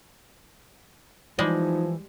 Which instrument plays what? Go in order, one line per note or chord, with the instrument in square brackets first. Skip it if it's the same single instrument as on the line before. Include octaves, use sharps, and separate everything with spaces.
[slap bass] E3 [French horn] F3 [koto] G3 G#3 [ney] D#4